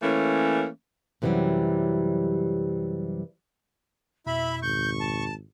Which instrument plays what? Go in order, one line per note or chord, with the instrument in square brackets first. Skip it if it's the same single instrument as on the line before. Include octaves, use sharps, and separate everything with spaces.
[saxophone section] E3 A3 A#3 C#4
[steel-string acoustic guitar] F#2 C3 E3 F#3 G3
[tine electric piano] F2 B2 [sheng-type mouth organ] E4 E5 [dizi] B5
[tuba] G#1 [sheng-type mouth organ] C#6 [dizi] G6
[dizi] A5